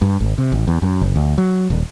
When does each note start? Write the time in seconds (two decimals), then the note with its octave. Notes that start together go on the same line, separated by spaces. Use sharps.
0.02 G2
0.20 G#1
0.38 C3
0.52 A1
0.68 E2
0.82 F#2
1.01 F#1
1.16 D2
1.38 F#3
1.70 D#1